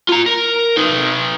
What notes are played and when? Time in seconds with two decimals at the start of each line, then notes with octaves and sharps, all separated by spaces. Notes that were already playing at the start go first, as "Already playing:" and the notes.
0.09 F4 A#5
0.26 A#4
0.77 D#4 B4